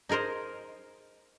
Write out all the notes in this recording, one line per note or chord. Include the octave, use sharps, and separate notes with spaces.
D#4 G#4 A#4 C5 D#5